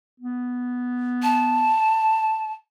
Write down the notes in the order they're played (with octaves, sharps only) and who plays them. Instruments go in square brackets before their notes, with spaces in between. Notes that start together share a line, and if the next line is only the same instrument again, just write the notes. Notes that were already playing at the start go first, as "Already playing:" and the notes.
[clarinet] B3
[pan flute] A5